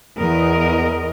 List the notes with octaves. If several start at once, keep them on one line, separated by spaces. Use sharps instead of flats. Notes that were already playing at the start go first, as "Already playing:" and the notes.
E2 A#4 D#5